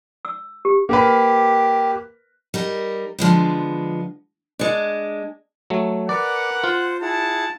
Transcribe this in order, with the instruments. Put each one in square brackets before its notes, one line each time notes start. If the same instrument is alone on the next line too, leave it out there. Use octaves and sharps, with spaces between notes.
[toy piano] E6
G4
[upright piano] A#3 A#4 B4 [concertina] G4
[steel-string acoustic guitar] G3 D#4 A#4
D3 F3 G#3 B3
G#3 D4
[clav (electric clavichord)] F#3 A3
[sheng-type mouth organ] A#4 B4 D6 [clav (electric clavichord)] D5 [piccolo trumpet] F#5
[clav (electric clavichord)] F4 [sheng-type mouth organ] C5
[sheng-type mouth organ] E4 G#4 F#5 [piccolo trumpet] A5